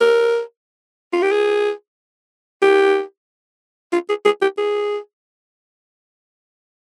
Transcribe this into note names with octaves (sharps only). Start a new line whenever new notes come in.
A#4
F4
G4
G#4
G4
F4
G#4
G#4
G4
G#4